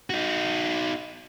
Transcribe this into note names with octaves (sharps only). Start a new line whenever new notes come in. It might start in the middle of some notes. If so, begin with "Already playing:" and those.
D#4 F#4